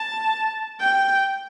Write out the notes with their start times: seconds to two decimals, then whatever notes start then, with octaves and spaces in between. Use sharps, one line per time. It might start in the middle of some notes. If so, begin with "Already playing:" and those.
Already playing: A5
0.80 G5